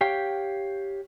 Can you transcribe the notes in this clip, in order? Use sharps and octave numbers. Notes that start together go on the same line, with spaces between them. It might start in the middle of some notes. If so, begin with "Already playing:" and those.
G4 C#5 F5 G5